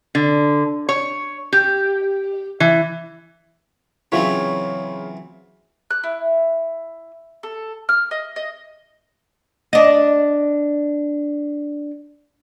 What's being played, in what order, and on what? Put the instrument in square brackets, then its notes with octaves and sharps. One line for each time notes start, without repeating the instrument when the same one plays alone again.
[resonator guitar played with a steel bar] D3
C#5
G4
E3
[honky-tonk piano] C#3 F4 [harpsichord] E3 F#3 C4 [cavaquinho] C#5
[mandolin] F#6
E4
A4
F6
D#5
D#5
[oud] D4 D#5